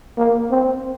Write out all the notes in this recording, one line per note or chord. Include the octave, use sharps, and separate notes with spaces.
A#3
C4